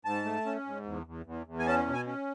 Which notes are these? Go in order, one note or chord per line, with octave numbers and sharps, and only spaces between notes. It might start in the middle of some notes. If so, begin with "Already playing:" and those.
G#2 A5
A3
C#4
G#2
E2
E2
E2
E2
G#5
C#4 A5
B2
G#5
C#4